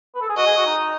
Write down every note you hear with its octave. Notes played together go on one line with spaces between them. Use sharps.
B4
A4
G#4
F#4 D#5
G#4
F#4
D#4